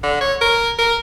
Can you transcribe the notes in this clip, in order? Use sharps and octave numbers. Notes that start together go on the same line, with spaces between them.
D3
C#5
A#4
A#4